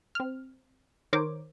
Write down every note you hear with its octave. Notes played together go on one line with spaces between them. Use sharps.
C4 F6
D#3 A#4 C5 C#5 D6